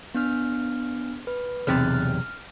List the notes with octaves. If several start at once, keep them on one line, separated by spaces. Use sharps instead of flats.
B3 D4 F6
B4
B1 E2 C3 F6 F#6 A6
F6